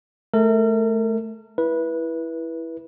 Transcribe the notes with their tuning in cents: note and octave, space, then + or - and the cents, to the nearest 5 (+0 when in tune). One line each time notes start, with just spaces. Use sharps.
A3 -20 A#4 -35
E4 +0 B4 -20